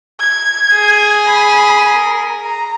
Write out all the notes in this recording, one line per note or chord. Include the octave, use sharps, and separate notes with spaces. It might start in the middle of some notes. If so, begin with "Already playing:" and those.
G#6
G#4
B5
A#4
A#5